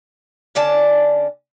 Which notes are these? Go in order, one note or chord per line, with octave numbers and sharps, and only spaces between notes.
D3 C#4 D5 A5